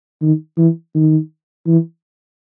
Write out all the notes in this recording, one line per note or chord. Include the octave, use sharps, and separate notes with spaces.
D#3
E3
D#3
E3